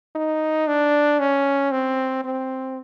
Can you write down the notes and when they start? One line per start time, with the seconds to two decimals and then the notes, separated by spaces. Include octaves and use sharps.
0.15 D#4
0.68 D4
1.19 C#4
1.72 C4
2.24 C4